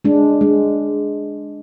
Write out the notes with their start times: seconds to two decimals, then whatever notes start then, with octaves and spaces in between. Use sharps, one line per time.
0.05 G#3 D4
0.41 G#3